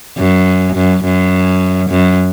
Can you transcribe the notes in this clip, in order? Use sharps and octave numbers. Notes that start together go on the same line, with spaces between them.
F#2
F#2
F#2
F#2